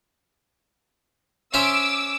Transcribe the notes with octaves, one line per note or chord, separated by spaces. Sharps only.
C#4 C5 E5 D6 E6